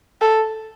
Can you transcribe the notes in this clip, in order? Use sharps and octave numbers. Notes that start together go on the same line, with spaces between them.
A4